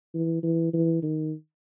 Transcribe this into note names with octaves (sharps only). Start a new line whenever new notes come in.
E3
E3
E3
D#3